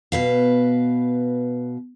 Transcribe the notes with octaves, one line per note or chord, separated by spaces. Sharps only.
B2 B4 F5